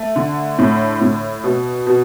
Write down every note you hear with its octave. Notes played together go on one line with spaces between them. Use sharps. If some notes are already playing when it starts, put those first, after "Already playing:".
Already playing: A3
D3
A2
A2
B2
B2